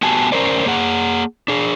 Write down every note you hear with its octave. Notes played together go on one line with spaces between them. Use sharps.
B3 F#4 G4 G#5 A5
C#4 A#4 C5 D5
A#3 G#4 F#5
D4 G#4